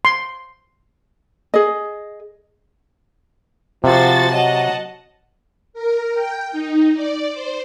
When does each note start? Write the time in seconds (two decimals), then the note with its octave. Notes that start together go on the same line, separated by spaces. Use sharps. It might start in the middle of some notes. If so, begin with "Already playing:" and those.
0.05 C6
1.54 G#4 D#5
3.84 C3 F3 F#4 C5 A6
4.32 F#3 D#5 F#5 A5
5.73 A#4
6.13 G5
6.52 D#4
6.94 D5
7.32 C5